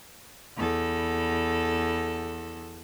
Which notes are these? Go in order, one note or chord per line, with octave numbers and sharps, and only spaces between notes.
E2 A4